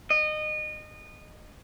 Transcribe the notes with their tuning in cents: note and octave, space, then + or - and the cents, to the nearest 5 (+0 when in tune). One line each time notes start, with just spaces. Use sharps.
D#5 -25